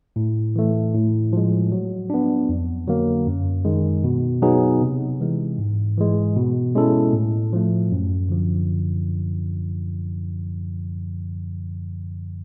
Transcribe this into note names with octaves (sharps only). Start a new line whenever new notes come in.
A2
E3 A3
A2
F3 G#3
F#3
B3 D4
F2
D3 F#3 A#3
F#2
D#3 G#3
B2
F#3 B3 D#4 G#4
C3
E3 G#3
G#2
E3 G#3
B2
G#3 C#4 E4 A4
A2
F3 A3
F#2
D3 F3